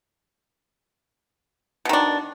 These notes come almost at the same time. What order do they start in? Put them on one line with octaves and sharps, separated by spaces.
B2 D#3 D4